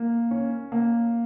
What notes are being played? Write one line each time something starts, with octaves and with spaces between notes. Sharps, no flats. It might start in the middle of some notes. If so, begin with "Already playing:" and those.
Already playing: A#3
C#4
A#3